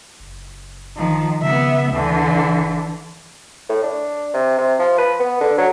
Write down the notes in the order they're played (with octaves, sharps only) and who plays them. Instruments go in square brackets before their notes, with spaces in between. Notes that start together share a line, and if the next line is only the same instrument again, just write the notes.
[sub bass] F#1
[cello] D#3 F3
[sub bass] C#3 [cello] B3 E5
[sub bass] D2 [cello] D3 E3
[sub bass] G1
[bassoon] A2
D4
C3
C3
F3
B4
B3
D3
F#3